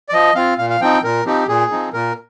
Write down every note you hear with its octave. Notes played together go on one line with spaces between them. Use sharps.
D5
F3 D#5
C4 F4 F5
A#2 F5
F5
F3 C4 D#4 G5
A#2 A#4
F3 C4 D#4 G4
A#2 G#4
F3 C4 D#4
A#2 A#4